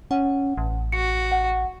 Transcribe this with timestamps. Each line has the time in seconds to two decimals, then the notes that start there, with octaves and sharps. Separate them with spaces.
0.11 C#4 F#5
0.57 A1
0.92 F#4 C#7
1.32 F#5